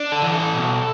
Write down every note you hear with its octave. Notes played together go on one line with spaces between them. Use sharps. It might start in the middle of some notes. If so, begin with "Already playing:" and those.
Already playing: D4
A4
E3
A4
B2